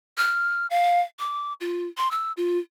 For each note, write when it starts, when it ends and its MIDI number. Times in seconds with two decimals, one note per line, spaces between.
0.18 0.67 89
0.70 1.01 77
1.19 1.53 86
1.61 1.87 65
1.97 2.11 84
2.11 2.32 88
2.37 2.59 65